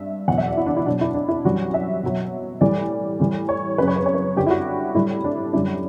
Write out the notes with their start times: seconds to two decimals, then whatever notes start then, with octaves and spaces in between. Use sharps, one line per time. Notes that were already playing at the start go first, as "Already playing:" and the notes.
Already playing: G2 E5
0.28 E2 B2 F#3 F#5
0.38 E5
0.48 D5
0.57 E4
0.66 D4
0.76 E4
0.86 B2 F#3 D4
1.01 E4
1.14 D4
1.28 E4
1.45 F#2 E3 G3 F#4
1.74 E5
2.03 B2 F#3
2.61 A2 E3 G3 D5
3.20 A2 E3 G3
3.49 C#5
3.78 F#2 C#3 F#3 B4
3.88 C#5
3.96 B4
4.06 C#5
4.14 B4
4.36 G2 D3 G3 G4
4.46 E4
4.51 F#4
4.94 A2 G3 E4
5.24 D4
5.53 F#2 D3 G3 E4